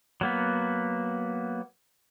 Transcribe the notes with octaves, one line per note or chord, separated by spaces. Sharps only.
F#3 A#3 B3